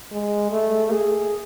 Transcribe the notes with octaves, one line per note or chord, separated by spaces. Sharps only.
G#3
A3
G#4